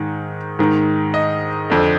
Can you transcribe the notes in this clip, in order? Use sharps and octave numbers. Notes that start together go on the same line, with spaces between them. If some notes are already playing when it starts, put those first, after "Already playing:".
Already playing: G#2 D#3
G#2 D#3
D#5
F2 D3